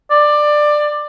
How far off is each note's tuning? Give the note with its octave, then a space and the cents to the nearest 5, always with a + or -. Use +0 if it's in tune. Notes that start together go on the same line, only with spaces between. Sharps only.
D5 +15